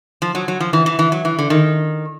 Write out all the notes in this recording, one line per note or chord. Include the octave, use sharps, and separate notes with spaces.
F3
F#3
F#3
F3
E3
E3
E3
F#3
E3
D3
D#3